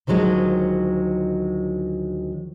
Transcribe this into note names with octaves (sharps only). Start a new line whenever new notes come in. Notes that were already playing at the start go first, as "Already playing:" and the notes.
D2 D#3 F3 F#3 G#3